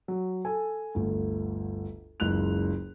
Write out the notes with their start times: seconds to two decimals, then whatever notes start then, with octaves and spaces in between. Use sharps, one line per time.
0.08 F#3
0.45 A4 G#5
0.95 G1 D2
2.20 F#1 C#2 F#6 F7